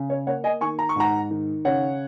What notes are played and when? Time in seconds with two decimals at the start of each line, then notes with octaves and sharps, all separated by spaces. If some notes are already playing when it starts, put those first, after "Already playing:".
Already playing: C#3
0.10 C#5
0.27 A#3 C#5 F#5
0.44 D#5 G#5
0.61 D#3 G#5 C#6
0.79 A#5
0.89 C#6
0.96 G#2 F#5 A#5
1.30 D#3
1.65 C#3 C#5 F#5